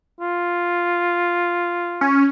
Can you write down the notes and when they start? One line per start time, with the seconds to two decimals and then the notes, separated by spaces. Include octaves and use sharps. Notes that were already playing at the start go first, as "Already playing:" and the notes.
0.20 F4
2.01 C#4